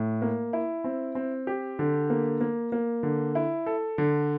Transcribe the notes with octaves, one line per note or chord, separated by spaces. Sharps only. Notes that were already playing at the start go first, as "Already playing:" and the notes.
Already playing: A2
A#3
E4
C4
C4
G4
D3
A#3
A#3
A#3
D3
E4
A4
D3